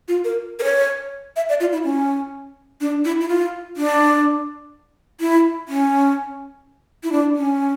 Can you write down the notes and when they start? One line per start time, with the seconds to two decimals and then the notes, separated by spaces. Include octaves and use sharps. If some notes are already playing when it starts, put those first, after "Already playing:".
0.08 F4
0.24 A#4
0.59 A#4
0.64 C#5
1.36 E5
1.49 D5
1.60 F4
1.72 E4
1.84 C#4
2.81 D4
3.05 E4
3.21 E4
3.29 F4
3.77 D4
5.20 E4
5.68 C#4
7.03 E4
7.12 D4
7.36 C#4